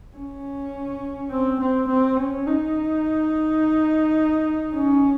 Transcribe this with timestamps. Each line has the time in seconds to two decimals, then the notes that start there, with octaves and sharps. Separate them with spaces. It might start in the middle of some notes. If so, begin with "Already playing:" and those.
0.16 C#4
1.30 C4
1.60 C4
1.88 C4
2.16 C#4
2.46 D#4
4.75 C#4